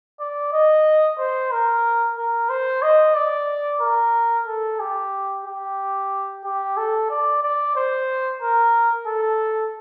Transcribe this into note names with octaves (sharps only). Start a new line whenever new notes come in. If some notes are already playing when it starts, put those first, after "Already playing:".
D5
D#5
C5
A#4
A#4
C5
D#5
D5
A#4
A4
G4
G4
G4
A4
D5
D5
C5
A#4
A4